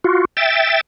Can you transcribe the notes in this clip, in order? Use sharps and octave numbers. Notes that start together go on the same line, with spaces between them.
F4 F#4
E5 G5 A6